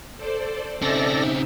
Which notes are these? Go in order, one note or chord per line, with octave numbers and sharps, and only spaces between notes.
A4 C5 D5
C#3 C4 D#4 A4 D5 E5 A#6